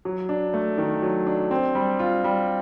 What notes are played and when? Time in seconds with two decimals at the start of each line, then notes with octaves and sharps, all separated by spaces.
0.05 F#3
0.29 D4
0.54 A3
0.78 D#3
1.02 F#3
1.27 D4
1.51 C4
1.75 G3
1.99 F4
2.24 G3